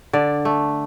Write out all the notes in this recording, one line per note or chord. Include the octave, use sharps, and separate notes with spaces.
D3 D5
A3